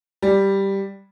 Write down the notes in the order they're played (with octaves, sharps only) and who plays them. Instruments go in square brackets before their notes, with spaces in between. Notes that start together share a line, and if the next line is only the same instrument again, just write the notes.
[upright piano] G3